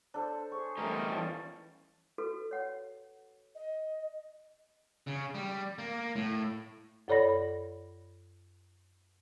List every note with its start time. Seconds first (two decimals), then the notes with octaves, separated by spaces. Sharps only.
0.14 D4 A4 C5
0.52 G#4 C5 C#6
0.78 E2 G3 A3 D#4 A#4
1.12 E3 F3 C#4 A5
2.18 F#4 A4 B4
2.51 C#5 F#5
3.55 D#5
5.07 C#3
5.35 G3
5.78 A#3
6.16 A2
7.08 F#2 A4 C#5 D5 B5 A#6